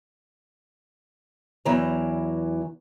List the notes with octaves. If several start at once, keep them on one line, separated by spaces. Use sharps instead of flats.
E2 E3 F#3 D4 A#5